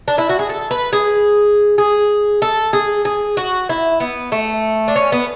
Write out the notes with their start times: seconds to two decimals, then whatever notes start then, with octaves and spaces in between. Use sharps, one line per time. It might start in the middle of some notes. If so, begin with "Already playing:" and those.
0.08 D4
0.18 E4
0.29 F#4
0.39 G#4
0.49 A4
0.71 B4
0.93 G#4
1.78 G#4
2.42 A4
2.73 G#4
3.05 G#4
3.37 F#4
3.69 E4
4.00 B3
4.32 A3
4.88 D4
4.96 C#4
5.12 B3